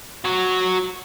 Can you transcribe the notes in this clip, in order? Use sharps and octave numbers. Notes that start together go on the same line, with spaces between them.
F#3 F#4